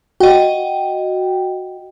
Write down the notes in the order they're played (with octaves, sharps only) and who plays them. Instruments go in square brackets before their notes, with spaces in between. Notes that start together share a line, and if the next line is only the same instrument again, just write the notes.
[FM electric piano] F#4 [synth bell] D#5 G5